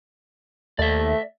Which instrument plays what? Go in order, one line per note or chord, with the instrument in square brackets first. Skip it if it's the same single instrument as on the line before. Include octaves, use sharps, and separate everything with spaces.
[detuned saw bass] D#2 [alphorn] A3 [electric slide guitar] D5 E5